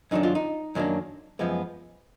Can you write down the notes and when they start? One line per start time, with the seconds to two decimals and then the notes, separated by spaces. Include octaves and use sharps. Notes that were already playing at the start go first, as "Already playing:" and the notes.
0.11 F#2 D#3 F#3 A#3 D4 D#4
0.23 F4
0.35 D#4
0.75 F#2 D#3 F#3 A#3 D4
1.39 F#2 F3 G#3 B3